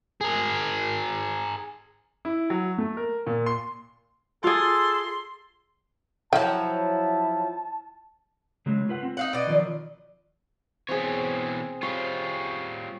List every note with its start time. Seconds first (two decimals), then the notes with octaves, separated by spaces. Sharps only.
0.21 G#4 A#4
2.25 E4
2.50 F#3
2.78 A3
2.97 A#4
3.27 A#2
3.46 C6
4.44 F4 G#4 A4 C6
6.33 F3 F#3 E4 G5 A5
8.66 C#3 F#3 G#3
8.89 F4 B4 F#5
9.03 C4
9.17 D#4 F5 F#5
9.33 B2 D5 D#5
9.47 D#3 F3 F#3
10.89 B2 E3 C4 G#4 C#5
11.83 G3 F4 C#5